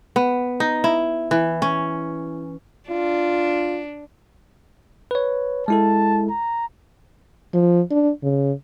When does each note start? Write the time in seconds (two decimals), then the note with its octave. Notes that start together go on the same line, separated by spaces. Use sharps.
0.16 B3
0.60 D#4
0.84 E4
1.31 E3
1.62 C#4
2.89 D4 F4
5.11 B4 C#5
5.68 G#3 E4 A4 A5
6.30 A#5
7.54 F3
7.91 D4
8.23 C#3